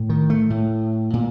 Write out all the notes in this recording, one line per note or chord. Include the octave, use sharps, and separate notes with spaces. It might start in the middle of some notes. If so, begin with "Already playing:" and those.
Already playing: A2
D#3
A3
A2
A#2